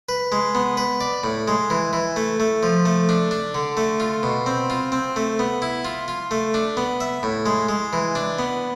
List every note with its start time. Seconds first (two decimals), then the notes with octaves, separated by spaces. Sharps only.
0.09 B4
0.32 G#3
0.55 B3
0.77 B4
1.00 D5
1.24 A2
1.48 G#3
1.70 E3
1.93 E3
2.16 A3
2.40 A3
2.63 F3
2.85 A3
3.09 D4
3.31 D4
3.55 D3
3.77 A3
4.00 F4
4.23 B2
4.46 C4
4.70 F4
4.92 C4
5.16 A3
5.39 B3
5.62 E4
5.85 F4
6.08 F4
6.31 A3
6.54 D4
6.77 B3
7.00 E5
7.23 A2
7.46 G#3
7.69 G#3
7.93 E3
8.15 D4
8.39 B3